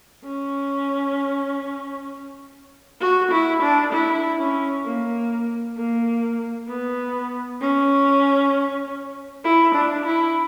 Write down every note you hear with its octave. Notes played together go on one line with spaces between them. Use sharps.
C#4
F#4
E4
D4
E4
C#4
A#3
A#3
B3
C#4
E4
D4
E4